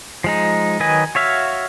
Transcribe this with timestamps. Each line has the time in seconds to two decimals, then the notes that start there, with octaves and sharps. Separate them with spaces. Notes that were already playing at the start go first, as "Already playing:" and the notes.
0.24 F3 G#3 D#4
0.80 D#3 F#3 B4 D#5 G#5
1.15 F#4 C#5 E5 F5